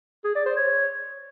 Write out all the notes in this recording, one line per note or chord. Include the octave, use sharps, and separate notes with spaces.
G#4
D5
C5
C#5